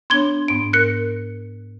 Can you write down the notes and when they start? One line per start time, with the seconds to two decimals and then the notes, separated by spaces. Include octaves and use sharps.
0.10 B3 D4 C#5 C6 G#6 G7
0.48 G#2 B3 D7
0.73 A#4 F#6 C#7